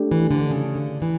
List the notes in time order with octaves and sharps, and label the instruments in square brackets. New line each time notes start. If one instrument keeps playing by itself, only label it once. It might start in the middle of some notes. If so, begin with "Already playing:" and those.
Already playing: [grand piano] A3 D4 G4
[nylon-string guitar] E3
D3
C#3
D3
E3